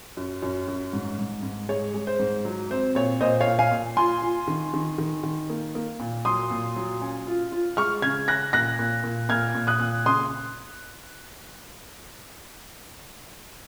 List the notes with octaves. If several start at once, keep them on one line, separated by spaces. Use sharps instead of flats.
F#2
F#2
F#2
G#2
G#2
G#2
G#3 C#5
G#3
C5
G#2
F#3
C4 C5
A#2 C#5
A#2 C5 D#5
C#5 F5
A#2
F5 G#5
A#2
F4 G#5 C6
F4
D#3
D#3
D#3
D#3
A#3
A#3
A#2
F#3 C6 D#6
A#2
F#3
C#4
F4
F4
G#3 C#6 F6
C#3 F6 G#6
C#4 F#6 A#6
A#2 F#6 A#6
A#2
A#2
A#2 F6 G#6
A#2
D#6 F#6
A#2
C#3 C6 D#6